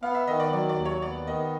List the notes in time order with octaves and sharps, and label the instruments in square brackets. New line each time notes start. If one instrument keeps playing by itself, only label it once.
[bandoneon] B3 [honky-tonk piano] F5
[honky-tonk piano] E5
[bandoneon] D#3 [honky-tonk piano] D#5
[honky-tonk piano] D5
[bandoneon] F#3 [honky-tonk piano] D5
[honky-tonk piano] D5
[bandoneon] D#2
[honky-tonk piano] C#5
[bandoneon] B3 [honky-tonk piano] D5
[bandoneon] D#3 [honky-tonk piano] D#5